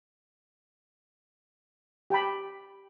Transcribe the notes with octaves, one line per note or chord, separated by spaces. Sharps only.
G4 G5 A5 B5